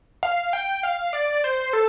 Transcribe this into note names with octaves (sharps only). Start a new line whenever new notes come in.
F5
G5
F5
D5
C5
A4